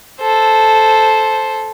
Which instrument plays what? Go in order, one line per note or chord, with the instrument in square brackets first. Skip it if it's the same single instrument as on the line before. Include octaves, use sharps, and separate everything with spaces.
[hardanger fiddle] A4 C5